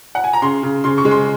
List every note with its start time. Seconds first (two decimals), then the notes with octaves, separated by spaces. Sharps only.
0.15 F#5
0.24 G#5
0.33 A#5
0.42 C#3 C6
0.63 C#3
0.84 C#3 C6
0.98 C#6
1.05 G#3
1.11 C6